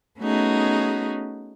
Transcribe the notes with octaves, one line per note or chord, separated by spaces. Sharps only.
A3 B3 C#4 D#4 F#4 G#4